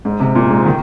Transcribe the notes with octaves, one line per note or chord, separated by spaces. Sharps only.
G#2
C3
A#2
G#2
D#3